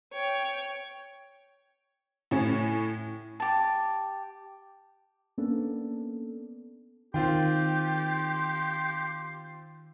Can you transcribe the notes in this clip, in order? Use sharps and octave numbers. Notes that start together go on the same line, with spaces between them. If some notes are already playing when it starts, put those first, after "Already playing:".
C#5 G5
A2 C#4
G4 A5
A#3 B3 C#4 D4 A4
D#3 C4 F4 G4 G5 C6